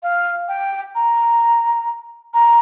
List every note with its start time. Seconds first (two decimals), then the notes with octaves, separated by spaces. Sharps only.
0.03 F5
0.48 G5
0.95 A#5
2.34 A#5